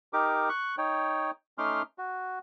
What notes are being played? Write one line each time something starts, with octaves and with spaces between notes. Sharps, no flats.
D#4 G4 A#4 D6
C#6 F#6
D#4 C#5 G5
A3 C#4 D#4 C6 D6 F6
F#4